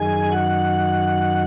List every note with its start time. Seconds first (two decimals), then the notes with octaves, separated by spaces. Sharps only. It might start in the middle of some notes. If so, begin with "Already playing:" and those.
Already playing: F#2 D#3 G#4 G#5
0.31 F#4 F#5